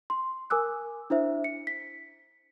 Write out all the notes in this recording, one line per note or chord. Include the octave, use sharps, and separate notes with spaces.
C6
A#4 G#5 D6 E6 F#6
D4 E4 C5 E5
C#7
B6